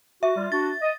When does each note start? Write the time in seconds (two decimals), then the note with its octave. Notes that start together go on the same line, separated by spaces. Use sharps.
0.23 F#4 E5
0.37 G3 F4
0.52 D4 F#4 A6
0.82 D#5